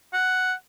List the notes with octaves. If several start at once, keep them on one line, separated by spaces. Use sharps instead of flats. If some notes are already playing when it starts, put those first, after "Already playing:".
F#5